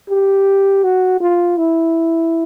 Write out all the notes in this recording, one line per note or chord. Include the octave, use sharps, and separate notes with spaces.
G4
F#4
F4
E4